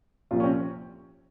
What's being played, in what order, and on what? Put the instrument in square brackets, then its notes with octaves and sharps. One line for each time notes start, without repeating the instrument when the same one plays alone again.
[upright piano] C2 A#2 F3 F4
C#4
C4